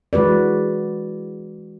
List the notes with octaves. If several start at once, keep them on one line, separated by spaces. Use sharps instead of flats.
E3 G#3 F#4 B4 D5